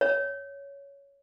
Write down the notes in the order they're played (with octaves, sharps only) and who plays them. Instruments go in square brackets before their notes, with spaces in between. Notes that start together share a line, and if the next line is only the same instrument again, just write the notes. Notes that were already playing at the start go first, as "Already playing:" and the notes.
[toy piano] C#5